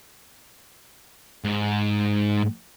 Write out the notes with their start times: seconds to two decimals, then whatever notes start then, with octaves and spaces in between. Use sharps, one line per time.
1.44 G#2